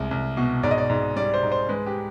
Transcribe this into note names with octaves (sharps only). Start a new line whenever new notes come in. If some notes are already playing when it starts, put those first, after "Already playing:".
Already playing: C2 G#3
C2
B2
G#2 D5
D#5
D5
G#2
G3 D5
C5
G#2
C5
G#3 B4
G4